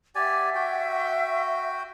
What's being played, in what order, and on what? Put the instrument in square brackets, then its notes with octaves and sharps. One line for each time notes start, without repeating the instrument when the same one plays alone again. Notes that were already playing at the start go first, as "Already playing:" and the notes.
[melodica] G4 D5 G#5 [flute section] E5 F#5
[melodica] F#4 G5